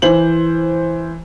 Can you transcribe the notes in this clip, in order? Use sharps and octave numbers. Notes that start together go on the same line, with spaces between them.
E3 C5 F#7